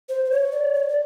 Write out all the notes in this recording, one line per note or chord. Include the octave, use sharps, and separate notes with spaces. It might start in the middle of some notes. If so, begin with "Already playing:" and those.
C5
C5
C#5
D5
C#5
D5